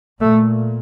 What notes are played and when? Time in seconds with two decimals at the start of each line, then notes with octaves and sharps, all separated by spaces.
0.20 A#2 A3